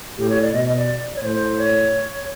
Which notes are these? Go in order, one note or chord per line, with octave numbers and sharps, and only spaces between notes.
A2 G4
C#5
D5
B2 D#5
D#5
D5
C#5
A2 C5
C#5